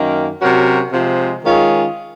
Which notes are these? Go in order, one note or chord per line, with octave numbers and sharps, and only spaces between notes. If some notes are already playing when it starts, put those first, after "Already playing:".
Already playing: F#2 D#3 A#3
C3 F#3 C#4 F#4 A#4
C3 F3 G#3
D#3 G#3 C#4 F4 G#4